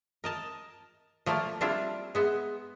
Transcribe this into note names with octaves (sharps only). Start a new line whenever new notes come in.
A#4 D#5 A5
F3 A3 A#3 F4 D5
G3 C4 D4 E4 F4
G#3 B3 E5